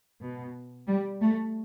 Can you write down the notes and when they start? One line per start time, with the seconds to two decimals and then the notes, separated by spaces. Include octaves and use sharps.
0.21 B2
0.87 G3
1.21 A3